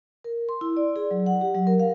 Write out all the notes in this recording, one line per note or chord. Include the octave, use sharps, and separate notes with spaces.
A#4
C6
E4
D5
G#4
F#3
F#5
G4
F#3
A#4
F5